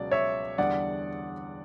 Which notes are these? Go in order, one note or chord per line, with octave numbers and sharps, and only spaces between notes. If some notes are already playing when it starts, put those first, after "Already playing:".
Already playing: C#2 B2 F#3 D5
C#5 E5
E2 D3 G3 D5 F#5